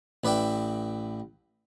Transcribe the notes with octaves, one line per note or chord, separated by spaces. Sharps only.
A1 B4 D5 E5 G5